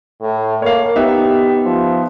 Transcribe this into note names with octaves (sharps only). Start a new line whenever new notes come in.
A2
A#3 C#5 F5
B3 D#4 G4 E5
F3